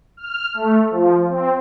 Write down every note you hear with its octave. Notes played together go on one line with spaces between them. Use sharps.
F6
A3
F3
C4